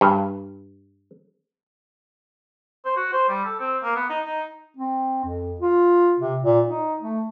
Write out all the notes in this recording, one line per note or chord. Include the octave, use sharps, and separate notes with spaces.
G2
C5
F#4
C5
G3
A4
C4
A#3
B3
D#4
D#4
C4
F2
F4
C3
A#2
D#4
A3